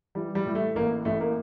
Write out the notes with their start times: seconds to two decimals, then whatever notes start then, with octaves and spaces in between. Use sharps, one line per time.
0.15 E3 G3
0.35 G3
0.46 A2
0.55 A3
0.75 A1 A#3
1.05 A1 A3
1.21 A#3